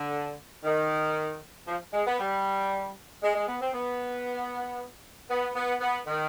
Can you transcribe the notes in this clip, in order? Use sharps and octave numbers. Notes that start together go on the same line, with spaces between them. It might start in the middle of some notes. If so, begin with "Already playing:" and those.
Already playing: D3
D#3
F3
G#3
B3
G3
G#3
G#3
B3
C4
B3
B3
B3
B3
D#3